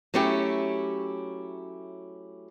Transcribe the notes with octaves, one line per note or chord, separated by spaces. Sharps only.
F#3 A3 C#4 E4 G4